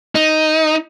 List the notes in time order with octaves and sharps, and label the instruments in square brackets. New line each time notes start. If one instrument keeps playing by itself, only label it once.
[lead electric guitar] D#4